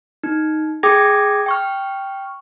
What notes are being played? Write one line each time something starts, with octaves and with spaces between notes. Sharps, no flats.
D#4
G#4 G5 D6 D#6 G#6 A#6
G5 C#6 F6